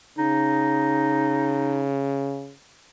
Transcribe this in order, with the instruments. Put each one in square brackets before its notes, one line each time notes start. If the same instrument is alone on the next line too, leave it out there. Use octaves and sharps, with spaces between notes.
[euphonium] C#3 [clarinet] D#4